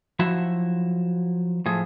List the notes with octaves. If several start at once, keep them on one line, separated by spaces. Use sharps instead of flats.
F3 F#3 E4 F#4 E5
A2 F3 G#4